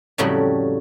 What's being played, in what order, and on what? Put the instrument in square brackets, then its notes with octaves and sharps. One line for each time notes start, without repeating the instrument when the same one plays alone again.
[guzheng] F2 A2 C#3 F#3 G3